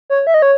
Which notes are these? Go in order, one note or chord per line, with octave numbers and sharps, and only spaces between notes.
C#5
E5
D#5
C#5